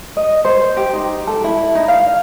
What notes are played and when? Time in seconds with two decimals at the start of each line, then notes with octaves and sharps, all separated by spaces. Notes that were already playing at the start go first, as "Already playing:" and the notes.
0.17 D#5
0.45 C5
0.77 G4
0.93 D#4
1.27 A4
1.44 E4
1.75 D#4
1.88 F5